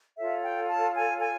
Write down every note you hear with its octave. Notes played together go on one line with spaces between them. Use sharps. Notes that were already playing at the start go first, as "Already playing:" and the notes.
F4 A4 C#5 E5
G5
A5
G#5
G#5